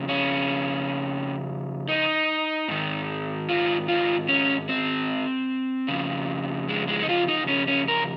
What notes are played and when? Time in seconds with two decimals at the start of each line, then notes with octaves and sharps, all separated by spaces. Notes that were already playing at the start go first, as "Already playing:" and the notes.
Already playing: F2 C#3
0.09 C#4
1.88 D#4
2.68 G#2 D#3
3.49 F4
3.88 F4
4.28 C#4
4.69 C4
5.88 F2 C#3
6.68 G#3
6.88 G#3
7.02 D#4
7.09 F4
7.28 D#4
7.48 C#4
7.68 C#4
7.88 A#4